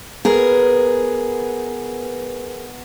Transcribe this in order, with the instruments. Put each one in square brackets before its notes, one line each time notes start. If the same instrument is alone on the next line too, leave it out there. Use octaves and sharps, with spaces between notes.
[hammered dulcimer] B3 [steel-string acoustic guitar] G#4 A#4